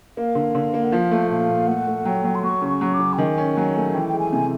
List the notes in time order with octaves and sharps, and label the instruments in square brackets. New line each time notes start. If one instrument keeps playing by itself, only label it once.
[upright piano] A#3 [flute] F5
[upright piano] D3
D3
A#3
[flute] F#5
[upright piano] F3 [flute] F5
[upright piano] A3
[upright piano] A#2 [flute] F5
[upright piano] A#2
[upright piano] A3 [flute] F#5
[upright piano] A3
[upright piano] F#3 [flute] G5
[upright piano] F#3
[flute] C6
[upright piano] F#3 [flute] C#6
[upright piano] C#3
[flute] C#6
[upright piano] F#3
[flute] D6
[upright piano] C#3
[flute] G5
[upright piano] D#3 [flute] G#5
[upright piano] C#4
F#3
A3
[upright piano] E3 [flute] G5
[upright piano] G#3 [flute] G5
[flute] G#5
[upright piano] C3